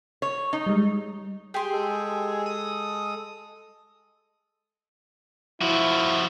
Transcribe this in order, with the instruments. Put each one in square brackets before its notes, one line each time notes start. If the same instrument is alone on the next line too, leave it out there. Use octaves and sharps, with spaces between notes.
[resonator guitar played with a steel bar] C#5
D#4
[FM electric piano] G3 G#3
[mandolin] G4 C6 [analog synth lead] G#4
[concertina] G#3 A4
[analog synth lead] D#6
[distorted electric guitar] F3 F#4 [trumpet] E4